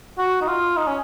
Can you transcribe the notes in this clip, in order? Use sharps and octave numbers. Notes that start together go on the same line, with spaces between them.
F#4
D#4
F4
D#4
C#4